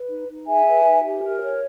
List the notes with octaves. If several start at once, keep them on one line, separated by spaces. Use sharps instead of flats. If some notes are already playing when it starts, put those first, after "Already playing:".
Already playing: B4
D#4
D#4
G#4 E5 G#5
B4
D#4
G4
A#4
C#5